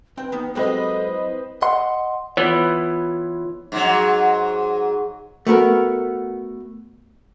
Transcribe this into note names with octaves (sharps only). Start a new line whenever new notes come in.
C4 B4 G5
D#3 B3
F#3 G#3 C4 G4 A4 B4 D#5
E4
D#5 F#5 C6
E3 B3 F4 C#5
G#2 F#3
A3 B3 F#4 A#4